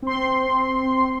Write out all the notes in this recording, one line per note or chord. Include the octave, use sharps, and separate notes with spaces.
C4 C6